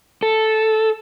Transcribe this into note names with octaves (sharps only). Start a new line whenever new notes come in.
A4